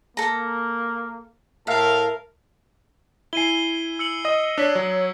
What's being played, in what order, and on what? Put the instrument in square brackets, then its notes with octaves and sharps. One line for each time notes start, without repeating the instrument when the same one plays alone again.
[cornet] A#3 [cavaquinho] A4 A#5
[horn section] A2 F5 [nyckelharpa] A#4 [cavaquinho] E5 [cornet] A5
[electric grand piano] E4 G#5 [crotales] C7 D#7 G7
[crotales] E6 C#7 F#7
[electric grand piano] D#5 D#6
[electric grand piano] D4 [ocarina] C#5 [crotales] E6 B6
[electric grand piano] F#3